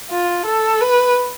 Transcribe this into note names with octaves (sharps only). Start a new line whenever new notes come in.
F4
A4
B4